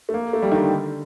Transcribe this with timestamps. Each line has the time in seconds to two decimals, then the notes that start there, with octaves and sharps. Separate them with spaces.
0.09 A3
0.14 A#3
0.33 A3
0.42 G3
0.52 D#3
0.61 D3